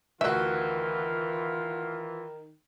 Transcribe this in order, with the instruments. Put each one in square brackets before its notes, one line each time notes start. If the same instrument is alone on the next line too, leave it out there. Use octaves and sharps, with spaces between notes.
[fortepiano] D2 F#4 [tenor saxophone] D#3 [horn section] E3 F4 [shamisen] E5